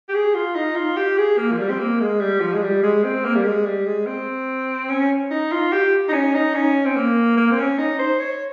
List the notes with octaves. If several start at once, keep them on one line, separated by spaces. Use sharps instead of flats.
G4
G#4
F4
D#4
F4
G4
G#4
A#3
F3
G3
C4
A#3
G#3
G3
F3
G#3
G3
G#3
C4
A#3
G3
G#3
G3
G#3
C4
C#4
D#4
F4
G4
D#4
C#4
D#4
C#4
C4
A#3
A#3
C4
C#4
D#4
C5
C#5